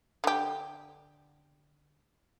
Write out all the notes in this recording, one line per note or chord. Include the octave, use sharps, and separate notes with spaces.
D3 G4